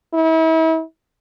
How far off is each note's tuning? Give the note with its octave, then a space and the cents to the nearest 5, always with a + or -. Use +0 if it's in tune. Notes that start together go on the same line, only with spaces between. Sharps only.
E4 -40